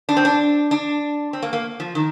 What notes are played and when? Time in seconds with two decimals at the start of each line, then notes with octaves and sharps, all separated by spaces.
0.09 D4
0.17 C4
0.25 D4
0.71 D4
1.33 C4
1.42 A#3
1.53 A#3
1.80 F3
1.95 D#3